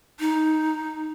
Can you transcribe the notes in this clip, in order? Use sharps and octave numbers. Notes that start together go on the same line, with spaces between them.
D#4